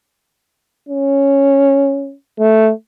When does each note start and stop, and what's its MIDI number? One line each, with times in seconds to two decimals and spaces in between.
0.89 2.15 61
2.40 2.71 57